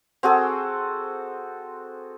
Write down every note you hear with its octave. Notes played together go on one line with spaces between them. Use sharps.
C4 F#4 G#4 A4